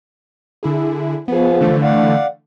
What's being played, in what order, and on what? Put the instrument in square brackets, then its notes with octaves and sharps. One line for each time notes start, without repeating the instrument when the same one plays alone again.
[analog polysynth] D3 E4 G#4
[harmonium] F3 [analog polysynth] B3 G#4
[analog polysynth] D3 E3 A3
[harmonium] D5 F5 F#5